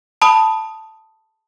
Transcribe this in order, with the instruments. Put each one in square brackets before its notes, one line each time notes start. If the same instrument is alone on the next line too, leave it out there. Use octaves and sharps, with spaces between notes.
[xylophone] A5 B5 D#6